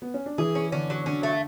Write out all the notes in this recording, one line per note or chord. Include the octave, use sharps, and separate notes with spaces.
B3
C#4
D4
E3 E4 G#4
C#4
D3 C#4 D4
F#3
D3 C#4 D4
A3